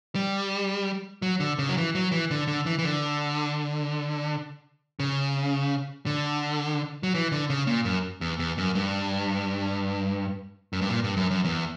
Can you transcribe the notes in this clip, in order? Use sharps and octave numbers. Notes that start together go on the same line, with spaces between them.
G3
F#3
D3
C#3
F#3
E3
F#3
E3
D3
D3
E3
E3
D3
C#3
D3
F#3
E3
D3
C#3
A#2
F#2
E2
E2
F#2
G2
F#2
G2
A#2
G2
F#2
F#2
E2